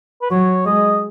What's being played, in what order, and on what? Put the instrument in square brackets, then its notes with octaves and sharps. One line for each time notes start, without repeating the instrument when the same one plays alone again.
[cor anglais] B4
[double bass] F#3 [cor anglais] C#5
[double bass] G#3 [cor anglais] D#5